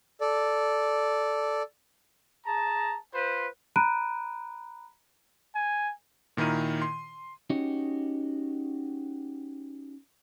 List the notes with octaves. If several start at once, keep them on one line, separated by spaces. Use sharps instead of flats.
A4 D5
G#4 A5 A#5
F4 B4 C5
A#5 B5 F#6 D7 D#7
G#5
A#2 D#3 E4 A#4 D#7
C6
C#4 D#4 F#4 G4 C#5 D#5